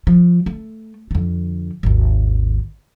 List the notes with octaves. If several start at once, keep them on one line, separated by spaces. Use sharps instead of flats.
F3
A3
F2 D3
G#1 D#2